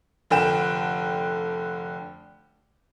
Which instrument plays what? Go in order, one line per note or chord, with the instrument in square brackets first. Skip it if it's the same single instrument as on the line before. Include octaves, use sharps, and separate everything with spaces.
[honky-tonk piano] F1 D3 G5 E7